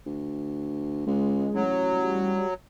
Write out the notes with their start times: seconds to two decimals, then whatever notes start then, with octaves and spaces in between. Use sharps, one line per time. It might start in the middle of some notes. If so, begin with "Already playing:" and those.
0.06 D2
1.07 C#2 G#3
1.54 A1 F#3
1.93 G3